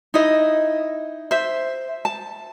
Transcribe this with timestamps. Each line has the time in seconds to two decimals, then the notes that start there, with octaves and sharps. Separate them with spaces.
0.14 D#4 E4 D#5
1.31 C5 E5
2.05 A5